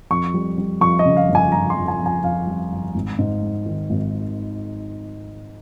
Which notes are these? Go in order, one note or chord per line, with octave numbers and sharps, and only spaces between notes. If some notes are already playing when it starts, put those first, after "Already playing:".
F2 C#6
G3
G3
F2 C#6
D#5
C#3
F5
G1
G#5
G1 A#5
C6
F2
G#5
F2
G#5
F2 F5
G3
G1
G#1
G#2
G#3
D#3
G#1